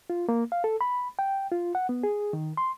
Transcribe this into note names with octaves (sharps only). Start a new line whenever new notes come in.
F4
A#3
F5
A4
B5
G5
F4
F#5
B3
G#4
D#3
C6